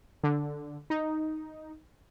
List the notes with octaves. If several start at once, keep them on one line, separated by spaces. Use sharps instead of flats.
D3
D#4